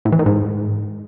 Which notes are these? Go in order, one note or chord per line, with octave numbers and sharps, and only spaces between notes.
A2
E3
D#3
G#2